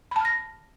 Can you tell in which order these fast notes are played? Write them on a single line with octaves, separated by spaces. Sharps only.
B5 A5 F6 A#6